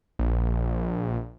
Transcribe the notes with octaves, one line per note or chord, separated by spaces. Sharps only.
A#1